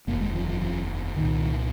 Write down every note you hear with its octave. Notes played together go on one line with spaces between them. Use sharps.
F1 D#2 A#3
G#3
F3
F3
F3
C2 A#2 D#3